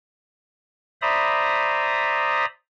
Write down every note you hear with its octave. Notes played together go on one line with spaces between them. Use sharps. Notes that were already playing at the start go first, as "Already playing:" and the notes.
C5 D5 E5 A#5 B5 D#6